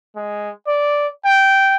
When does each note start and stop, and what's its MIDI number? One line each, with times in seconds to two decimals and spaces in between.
0.16 0.50 56
0.67 1.07 74
1.25 1.76 79